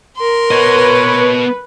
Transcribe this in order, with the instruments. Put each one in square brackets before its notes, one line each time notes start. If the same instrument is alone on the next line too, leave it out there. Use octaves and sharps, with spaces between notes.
[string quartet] A#4 C6
[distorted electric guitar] B3 D#5 [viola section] B4 [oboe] C#5